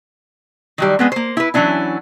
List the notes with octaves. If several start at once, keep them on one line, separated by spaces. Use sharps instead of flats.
D#3 F#3 G3
G#3 B3 C4
A#3 C5
E4 B4
E3 F#3 C#4 D4 E4